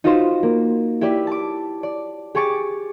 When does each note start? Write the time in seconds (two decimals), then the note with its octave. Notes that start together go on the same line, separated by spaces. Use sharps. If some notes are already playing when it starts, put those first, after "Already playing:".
0.04 D#4 F4 F#4 B4 C5
0.43 A#3
1.01 E4 G4 B4 D5
1.27 A5 D6
1.83 D5
2.35 G4 G#4 C#6 D6 A6